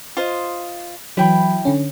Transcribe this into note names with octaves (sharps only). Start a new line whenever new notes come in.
F4 C5 D#5
E3 F#3 E4 G5 B5
D3 C#4